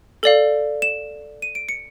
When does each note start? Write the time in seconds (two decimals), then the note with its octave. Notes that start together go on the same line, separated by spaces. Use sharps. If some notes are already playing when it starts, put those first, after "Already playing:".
0.23 A4 D5 F5 F#7
0.82 E7
1.42 D#7
1.55 D7
1.69 C#7